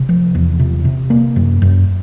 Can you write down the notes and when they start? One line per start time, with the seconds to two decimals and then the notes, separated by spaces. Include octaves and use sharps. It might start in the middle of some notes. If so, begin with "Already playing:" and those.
Already playing: C3
0.09 F3
0.35 E2
0.59 C3
0.85 C3
1.10 A#3
1.36 F#2
1.62 F#2